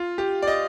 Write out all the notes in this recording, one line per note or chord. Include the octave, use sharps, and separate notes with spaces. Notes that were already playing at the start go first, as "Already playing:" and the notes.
Already playing: F4
G4
D5
D#5